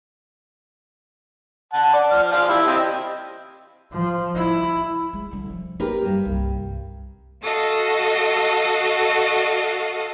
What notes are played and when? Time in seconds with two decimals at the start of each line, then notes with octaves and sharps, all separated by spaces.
1.73 F#5 A5
1.93 D5
2.12 F3 F6
2.31 F3 F4 D5
2.49 E4 G4
2.67 C4 G4 D#5
3.92 F3
4.36 E4
5.13 G#3
5.31 D3 G3
5.50 F3
5.80 A#3 G4 A#4 B4
6.05 G2
6.25 C2
7.42 F#4 A4 D#5 F5